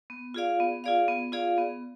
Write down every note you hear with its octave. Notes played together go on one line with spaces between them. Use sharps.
B3
F4 G#4 D5 F5
B3
F4 G#4 D5 F5
B3
F4 G#4 D5 F5
B3